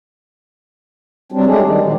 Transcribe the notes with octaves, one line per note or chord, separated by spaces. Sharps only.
F#3 G3 C4 D4
F#3 G#3 A3 D4 G4 G#4
D#3 G3
A#2 D#3 F3 F#3 G#3